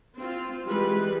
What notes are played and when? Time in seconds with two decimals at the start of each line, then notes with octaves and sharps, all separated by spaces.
0.19 C4 F4
0.66 E3 G3 G#3 B4